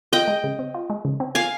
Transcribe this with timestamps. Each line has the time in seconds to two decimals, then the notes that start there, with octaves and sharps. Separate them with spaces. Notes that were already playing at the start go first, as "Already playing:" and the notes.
0.13 F4 D#5 G5
0.28 G#3
0.44 C#3
0.59 C4
0.74 F4
0.90 G#3
1.05 C#3
1.20 C4
1.35 F4 F5 G#5